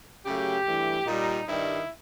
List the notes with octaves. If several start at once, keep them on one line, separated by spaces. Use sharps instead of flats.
C#3 F#3 A3 G4
G2 E3 A3
A#2 G3 D#4
G2 D#3 G3 E4